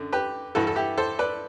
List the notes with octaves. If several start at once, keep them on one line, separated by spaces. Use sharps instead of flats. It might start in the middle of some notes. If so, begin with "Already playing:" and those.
Already playing: F#2 D3
G4 B4
G2 E3 F#4 A4
A4
E4 G4
A4 C5
B4 D5